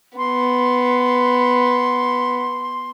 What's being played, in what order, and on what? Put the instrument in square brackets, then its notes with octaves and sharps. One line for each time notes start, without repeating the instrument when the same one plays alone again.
[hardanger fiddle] B3 [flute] C6